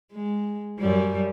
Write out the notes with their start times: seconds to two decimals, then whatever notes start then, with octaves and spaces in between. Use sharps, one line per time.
0.13 G#3
0.79 F#2 G3